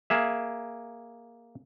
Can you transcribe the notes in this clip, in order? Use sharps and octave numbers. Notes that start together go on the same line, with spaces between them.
A#3 G#4 E5